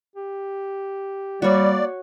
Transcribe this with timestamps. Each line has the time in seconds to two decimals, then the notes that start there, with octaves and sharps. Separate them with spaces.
0.15 G4
1.42 G3 A#3 F#4 C#5 D5